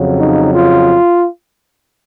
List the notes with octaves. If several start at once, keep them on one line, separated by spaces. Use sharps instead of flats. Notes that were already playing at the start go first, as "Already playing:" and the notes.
Already playing: F2 C#3 F#3
D#4
F4